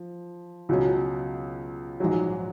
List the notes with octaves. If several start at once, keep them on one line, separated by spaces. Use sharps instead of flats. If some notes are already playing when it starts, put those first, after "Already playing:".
Already playing: F3
C#2 B2 F#3 C#4
A#1 G#2 F#3